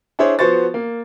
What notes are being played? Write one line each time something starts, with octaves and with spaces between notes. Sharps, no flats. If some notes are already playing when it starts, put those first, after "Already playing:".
D4 E4 G#4 C5 C#5
F3 B3 F#4 C5 C#6 A6
A#3